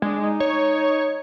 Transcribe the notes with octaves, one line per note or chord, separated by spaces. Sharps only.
G#3 D4
D#4
C#5